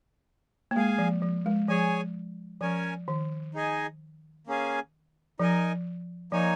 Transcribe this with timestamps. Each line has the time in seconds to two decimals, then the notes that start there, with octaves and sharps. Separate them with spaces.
0.71 A#3
0.76 G#3 G#4 F5 G#5
0.98 F3
1.22 F3
1.46 G#3
1.68 F3 G#4 C#5 G#5
2.61 F3 C#4 A#4 C#5 G#5
3.08 D#3
3.54 D#4 G#4 D#5 G#5
4.47 A#3 C#4 G#4 F5 G#5
5.40 F3 D#4 A#4 D#5 G#5
6.32 F3 A#3 D#4 C#5 G#5